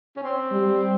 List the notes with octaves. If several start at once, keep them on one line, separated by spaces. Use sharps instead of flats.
C#4
C4
G3